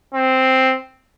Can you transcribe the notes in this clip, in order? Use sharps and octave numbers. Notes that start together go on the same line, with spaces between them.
C4